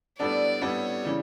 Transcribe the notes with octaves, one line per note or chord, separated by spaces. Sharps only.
A2 G3 B3 D4 A4 D5
A2 G3 B3 D4 A4 C#5
C#3 E3 G3